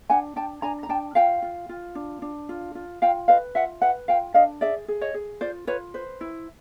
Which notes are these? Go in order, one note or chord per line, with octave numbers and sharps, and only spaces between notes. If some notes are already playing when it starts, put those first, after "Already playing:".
D4 F#5 G#5
D4 G5 A5
D4 G#5 A#5
A#5
D4 G5 A5
F4 F5 G5
F4
F4
D4
D4
F4
F4
F4 F5 G5
B4 D#5 F5
F4 E5 F#5
B4 E5 F#5
F4 F5 G5
D4 D#5 F5
G#4 D5 E5
G#4
C#5 D#5
G#4
F4 C5 D5
F4 B4 C#5
B4 C5
E4